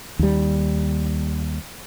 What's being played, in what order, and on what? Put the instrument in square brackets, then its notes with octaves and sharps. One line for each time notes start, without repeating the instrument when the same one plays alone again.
[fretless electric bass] D#2 G3